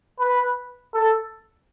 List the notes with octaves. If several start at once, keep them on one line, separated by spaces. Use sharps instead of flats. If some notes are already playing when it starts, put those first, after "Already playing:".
B4
A4